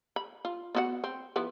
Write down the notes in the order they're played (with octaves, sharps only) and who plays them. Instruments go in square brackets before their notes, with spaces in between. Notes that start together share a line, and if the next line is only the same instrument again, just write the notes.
[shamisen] B5
F4
B3 F#4 F#5
C4
F3 B3 E4